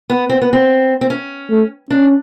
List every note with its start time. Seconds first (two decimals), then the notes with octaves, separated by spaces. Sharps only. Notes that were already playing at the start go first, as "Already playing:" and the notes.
0.10 B3
0.29 C4
0.42 B3
0.53 C4
1.01 C4
1.10 C#4
1.51 A3
1.90 C#4 D4